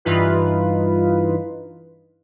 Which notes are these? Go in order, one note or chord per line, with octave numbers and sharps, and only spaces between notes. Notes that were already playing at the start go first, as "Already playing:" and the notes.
G2 E3 D#4 F4 B4